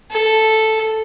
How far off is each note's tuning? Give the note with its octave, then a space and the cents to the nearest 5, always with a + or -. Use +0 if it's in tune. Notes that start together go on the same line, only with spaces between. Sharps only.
A4 -5